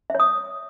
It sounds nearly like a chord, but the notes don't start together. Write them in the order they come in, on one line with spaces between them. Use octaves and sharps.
E5 C#5 D#6